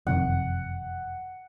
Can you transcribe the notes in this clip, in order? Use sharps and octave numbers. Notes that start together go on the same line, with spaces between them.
F#1 F2 C3 D#3 F#5